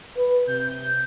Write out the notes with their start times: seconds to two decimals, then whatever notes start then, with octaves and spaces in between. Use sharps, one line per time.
0.16 B4
0.47 C3 G6